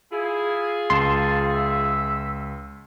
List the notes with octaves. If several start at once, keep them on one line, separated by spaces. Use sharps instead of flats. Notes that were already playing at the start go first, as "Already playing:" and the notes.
E4 F4 G#4
C#2 A5 C6 E7
E5